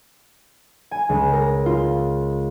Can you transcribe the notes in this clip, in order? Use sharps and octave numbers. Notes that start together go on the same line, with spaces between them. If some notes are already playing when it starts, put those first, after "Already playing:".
G#5
C#2
A#4
F4